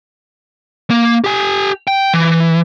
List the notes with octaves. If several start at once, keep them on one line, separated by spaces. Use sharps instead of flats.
A#3
G4 G#5
G5
E3